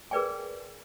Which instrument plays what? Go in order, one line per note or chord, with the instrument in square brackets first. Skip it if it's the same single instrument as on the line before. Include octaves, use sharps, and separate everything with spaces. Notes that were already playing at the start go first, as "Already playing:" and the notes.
[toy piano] G#4 A#4 B4 D5 G5 G#5